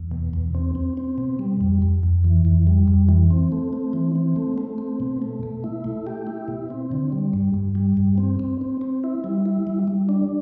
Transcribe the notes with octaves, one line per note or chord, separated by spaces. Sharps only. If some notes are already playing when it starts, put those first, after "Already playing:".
Already playing: E2
B2
E2
C4
C4
C4
B2
G3
F2
F2
F2
E3
F2
G3
F2
E3
C4
A3
C4
E3
C4
A3
A3
C4
B2
A3
B2
E4
A3
G4
E4
B2
C4
D3
G3
G2
G2
G3
G2
C4
C4
C4
C4
E4
G3
E4
G3
G3
D4